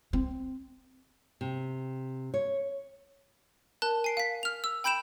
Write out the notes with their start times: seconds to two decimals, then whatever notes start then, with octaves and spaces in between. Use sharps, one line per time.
0.13 C4
1.41 C3
2.34 C#5
3.82 A#4 A5 F#6
4.04 G#5 C7 D7
4.17 F5 B6
4.43 F6 F7
4.64 E6
4.84 G5 B5 G6 D7 E7 F7